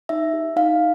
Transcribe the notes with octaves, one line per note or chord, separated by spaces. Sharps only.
D#4 E5
G4
D#4 F5